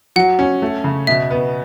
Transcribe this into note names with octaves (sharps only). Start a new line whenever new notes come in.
F#3 F#5
C#4
A3
C#3
B2 E5
B3